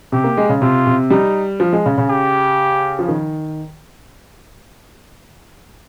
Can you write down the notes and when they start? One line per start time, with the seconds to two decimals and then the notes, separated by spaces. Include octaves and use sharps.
0.12 C3 G4
0.24 A#3
0.37 G#3
0.49 C#3
0.62 C3 F4
0.87 C3
1.10 G3 D#4
1.60 F3
1.73 G#3
1.86 C#3
1.98 C#3
2.09 G4
2.99 F3
3.08 D#3